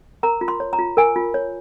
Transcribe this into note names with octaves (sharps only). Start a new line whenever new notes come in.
A#4 A#5
F4
C6
C#5
A#5
F4
A#4 G#5
F4
C#5